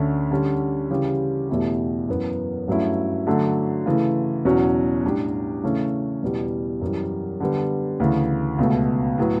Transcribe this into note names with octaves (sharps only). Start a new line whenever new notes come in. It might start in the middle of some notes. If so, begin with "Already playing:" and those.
Already playing: D2 D3 A3 C#4
D3 G3 C#4
C#3 E3 G3 C#4 G4
E2 B2 A3 E4 G4
F#2 E3 B3
G2 F#3 A3 C#4 E4
D3 F#3 A3
C#3 E3 A3
E2 B2 F#3 C#4 F#4
A2 G3 D4 G4
C#3 E3 A3 C#4
E2 B2 G3
F#2 E3 G3
D3 G3 B3
D2 C#3 E3
C#2 B2 A3
A2 F#3 B3